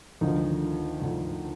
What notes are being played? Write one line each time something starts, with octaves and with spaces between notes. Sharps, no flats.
D2 D3 D#3 F3 D#4
D2 D3 F3